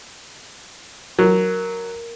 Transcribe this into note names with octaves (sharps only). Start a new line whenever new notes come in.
F#3 A#4